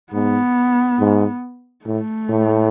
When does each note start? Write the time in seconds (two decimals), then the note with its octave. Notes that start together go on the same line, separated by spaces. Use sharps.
0.12 G#2 B3
0.99 G#2
1.86 A2 A3
2.29 A2